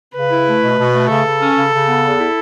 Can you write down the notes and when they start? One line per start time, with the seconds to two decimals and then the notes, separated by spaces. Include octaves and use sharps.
0.15 C#3 B4
0.31 E4
0.47 A3
0.63 B2
0.78 B2
0.94 A3
1.09 C#3 A4
1.25 C#3
1.41 C#4
1.57 C#3
1.73 C#3
1.87 B3
2.04 E2
2.19 E4